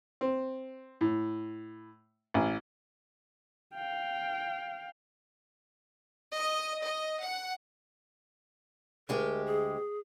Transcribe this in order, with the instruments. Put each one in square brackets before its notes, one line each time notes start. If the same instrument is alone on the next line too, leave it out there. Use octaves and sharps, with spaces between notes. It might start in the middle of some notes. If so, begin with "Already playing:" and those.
[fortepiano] C4
A2
A1
[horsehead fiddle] F5 G5
[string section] D#5
D#5
F#5
[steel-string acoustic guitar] D2 G#3 G4 [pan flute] A#4
[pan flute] G#4